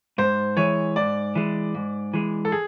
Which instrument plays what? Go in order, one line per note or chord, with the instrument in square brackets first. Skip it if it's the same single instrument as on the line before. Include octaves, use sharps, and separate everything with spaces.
[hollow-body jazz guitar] G#2 [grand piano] C5
[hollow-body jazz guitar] E3 G#3 [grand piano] C#5
[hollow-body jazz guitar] G#2 [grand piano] D5
[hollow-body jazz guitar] E3 G#3
G#2
E3 G#3
[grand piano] A4
G#4